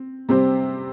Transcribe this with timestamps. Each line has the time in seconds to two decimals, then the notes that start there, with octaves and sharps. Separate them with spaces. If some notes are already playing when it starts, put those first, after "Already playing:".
Already playing: C4
0.29 C3 G3 C4 G4 C5